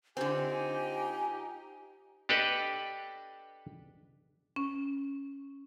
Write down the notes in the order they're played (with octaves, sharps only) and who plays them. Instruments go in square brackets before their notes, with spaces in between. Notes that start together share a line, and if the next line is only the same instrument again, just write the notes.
[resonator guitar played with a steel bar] D3 C4 [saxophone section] D#4 F4 G4 [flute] G#5
[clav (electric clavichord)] D4 G4 A4 B4 D#5
[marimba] C#4